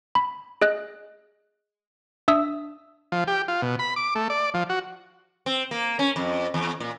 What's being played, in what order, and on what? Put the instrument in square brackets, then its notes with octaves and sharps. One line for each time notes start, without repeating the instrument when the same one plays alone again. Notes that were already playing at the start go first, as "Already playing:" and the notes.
[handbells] B5
G#4 D#5 F#6
D4 E5 D#6 E6
[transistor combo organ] F3
G4
F4
B2
B5
D6
A3
D5
F3
F#4
[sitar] C4
A#3
C#4
F2
E2
A#2